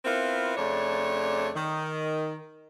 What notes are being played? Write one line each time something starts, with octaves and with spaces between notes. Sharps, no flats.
B3 C4 E4 F4 A#4
F2 C#3 A3 D4 C#5 D5
D#3